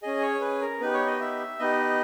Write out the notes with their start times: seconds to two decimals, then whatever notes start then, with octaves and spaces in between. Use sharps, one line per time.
0.03 C#4 G#4 D#5
0.21 C#5
0.41 B4
0.61 A#4
0.80 B3 D#4 G4 B4
0.94 C#5
1.07 D#5
1.21 E5
1.59 B3 D#4 G4 D#5